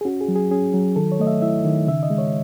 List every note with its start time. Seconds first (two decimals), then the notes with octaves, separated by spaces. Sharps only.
0.01 G#4
0.05 C#4 F#4
0.21 G#4
0.28 F#3
0.36 G#4
0.51 C#4 G#4
0.74 F#3
0.96 D#3 A4
1.12 C#5
1.19 A3 D#5
1.27 E5
1.42 E4 E5
1.65 D#3
1.87 C#3 E5
2.03 D#5
2.10 G#3
2.18 C#5